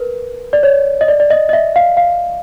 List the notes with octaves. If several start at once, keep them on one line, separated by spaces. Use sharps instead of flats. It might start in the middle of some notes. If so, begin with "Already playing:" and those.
Already playing: A#4 B4
D5
C#5
D#5
D5
D5
D#5
D#5
E5
F5
F5